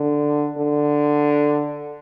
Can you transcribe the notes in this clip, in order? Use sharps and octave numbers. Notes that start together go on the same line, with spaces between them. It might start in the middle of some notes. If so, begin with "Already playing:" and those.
Already playing: D3
D3